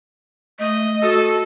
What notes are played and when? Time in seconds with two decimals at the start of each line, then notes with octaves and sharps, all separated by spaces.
0.59 A3 D#5
1.02 F#4 A4